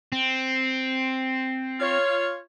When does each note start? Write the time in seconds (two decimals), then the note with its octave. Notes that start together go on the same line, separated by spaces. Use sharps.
0.12 C4
1.80 F4 C#5